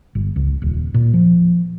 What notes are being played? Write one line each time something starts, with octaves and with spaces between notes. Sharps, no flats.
G1
C#2
D#1
A#2
F3